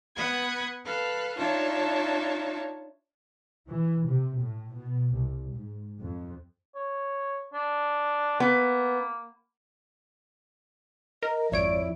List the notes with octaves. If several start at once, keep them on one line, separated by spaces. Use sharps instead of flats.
B3 F#5 B5 D#6 G#6
A4 B4 F5
D4 D#4 F4 C#5 E5 A5
E3
C3
A2
B2
C2
G#2
F2
C#5
D4
A#3 B3
A#4 D#5
G#1 F2 E4 C#5 D5 D7